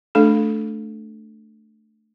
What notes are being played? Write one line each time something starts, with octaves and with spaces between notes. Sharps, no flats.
A3 D4 A4